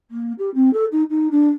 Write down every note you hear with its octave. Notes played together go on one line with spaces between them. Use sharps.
A#3
G4
C4
A4
D#4
D#4
D4